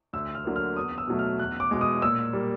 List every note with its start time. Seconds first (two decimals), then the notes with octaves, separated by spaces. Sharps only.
0.13 D2 E6
0.35 F6
0.45 D3 F#3 A#3
0.56 F6
0.76 E2 D#6
0.98 E6
1.08 B2 F#3 A3
1.19 F6
1.39 E2 F#6
1.60 D6
1.71 B2 G#3 D6
1.81 D#6
2.02 A#2 E6
2.33 G3 A#3